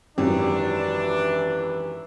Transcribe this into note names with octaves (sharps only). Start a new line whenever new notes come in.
G#1 F#2 E3 D4 G4